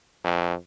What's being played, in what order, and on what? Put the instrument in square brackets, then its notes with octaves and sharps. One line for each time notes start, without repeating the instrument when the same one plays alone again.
[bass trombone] F2